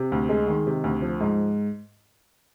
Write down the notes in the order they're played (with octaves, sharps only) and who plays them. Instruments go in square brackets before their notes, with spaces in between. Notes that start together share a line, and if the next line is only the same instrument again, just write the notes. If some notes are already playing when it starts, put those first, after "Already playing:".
Already playing: [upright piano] C3
D2
G#3
D#3
C3
D2
F3
G#2